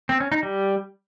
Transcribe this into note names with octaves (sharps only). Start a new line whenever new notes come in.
C4
C#4
D#4
G3